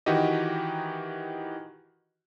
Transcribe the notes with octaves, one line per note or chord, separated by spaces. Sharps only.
D#3 E3 D#4 F#4 G4 D#5